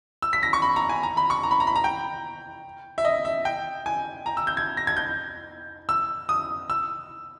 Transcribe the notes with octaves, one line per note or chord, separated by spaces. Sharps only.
E6
B6
A#6
C#6
B5
A#5
G#5
A#5
B5
C#6
A#5
B5
A#5
B5
A#5
G5
E5
D#5
E5
G5
G#5
A#5
E6
G6
G#6
A#6
G#6
G6
E6
D#6
E6